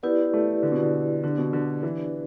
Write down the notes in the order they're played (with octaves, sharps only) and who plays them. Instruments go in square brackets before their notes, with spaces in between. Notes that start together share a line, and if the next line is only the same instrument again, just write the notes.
[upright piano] B3 [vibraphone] E4 G4 B4 D5
[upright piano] A3
D3
B2
D3
[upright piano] D3 [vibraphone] B3 D4 G4 D5
[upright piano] B2
D3
E3